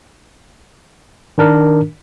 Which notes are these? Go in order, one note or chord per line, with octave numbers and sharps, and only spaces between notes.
D#3 D4 A#4